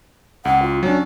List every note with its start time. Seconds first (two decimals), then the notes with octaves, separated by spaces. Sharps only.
0.45 C#2 F#5
0.62 F4
0.83 F#3 C#4 D4 C#5